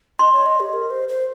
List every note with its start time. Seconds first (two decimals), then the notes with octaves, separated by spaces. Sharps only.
0.19 D#5 C6
0.33 C#5
0.46 D#5
0.60 G4
0.73 A#4
0.90 C5
1.09 C5